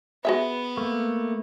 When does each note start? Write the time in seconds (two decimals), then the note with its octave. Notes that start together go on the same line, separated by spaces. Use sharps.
0.25 B3 F#4 G#4 E5
0.77 A3 A#3